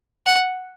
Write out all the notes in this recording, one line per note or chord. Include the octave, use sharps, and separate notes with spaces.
F#5